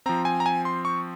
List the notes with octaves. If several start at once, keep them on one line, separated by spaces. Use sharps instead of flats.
F3 C4 A#5
G#5
A#5
G#5
C6
C#6